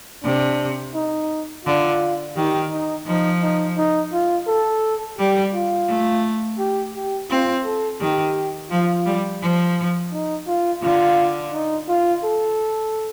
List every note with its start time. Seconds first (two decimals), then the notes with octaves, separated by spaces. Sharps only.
0.24 C3 D4
0.94 D#4
1.65 D3 F4
2.36 D#3 G4
2.71 D#4
3.06 F3 D#4
3.42 D#4
3.78 D#4
4.13 F4
4.47 A4
5.18 G3 G4
5.54 F4
5.88 A3
6.59 G4
6.94 G4
7.30 C4 F4
7.65 A4
8.00 D#3 G4
8.70 F3 F4
9.06 G3
9.41 F3
10.12 D#4
10.47 F4
10.82 D3 F4
11.53 D#4
11.88 F4
12.24 A4